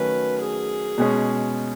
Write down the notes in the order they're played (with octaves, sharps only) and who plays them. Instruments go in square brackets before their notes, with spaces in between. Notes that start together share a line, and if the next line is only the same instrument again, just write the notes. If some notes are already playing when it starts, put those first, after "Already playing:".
Already playing: [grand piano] D#3 F#3 A3 C#4 F#4 [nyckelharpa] B4
[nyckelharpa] G#4
[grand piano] B2 G#3 C#4